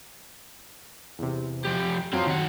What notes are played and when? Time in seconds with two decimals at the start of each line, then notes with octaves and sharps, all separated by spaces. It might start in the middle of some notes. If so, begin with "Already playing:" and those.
1.19 E2 C3
1.64 F3 G4
2.13 F#3 C4 F4
2.27 D#3 F#5